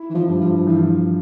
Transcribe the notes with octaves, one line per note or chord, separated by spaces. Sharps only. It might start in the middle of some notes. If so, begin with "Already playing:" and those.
Already playing: E4
E3
F3
G2
F3
E3 F3